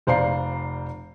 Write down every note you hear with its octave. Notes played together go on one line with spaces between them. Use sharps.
F1 C5 D5 F5 A#5 C7